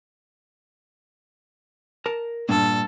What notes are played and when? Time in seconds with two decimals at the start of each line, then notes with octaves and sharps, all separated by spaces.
2.06 A#4 A5
2.49 G2 A#2 A4